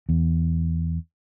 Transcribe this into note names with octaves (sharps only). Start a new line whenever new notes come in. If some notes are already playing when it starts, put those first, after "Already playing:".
E2